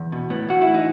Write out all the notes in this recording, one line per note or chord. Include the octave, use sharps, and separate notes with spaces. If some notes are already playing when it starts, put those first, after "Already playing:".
Already playing: E2
B2
A2 B3
A2 F#4
E4
E3
D#4